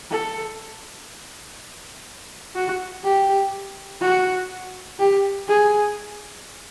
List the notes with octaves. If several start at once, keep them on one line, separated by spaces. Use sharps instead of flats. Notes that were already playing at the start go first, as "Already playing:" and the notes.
A4
F#4
G4
F#4
G4
G#4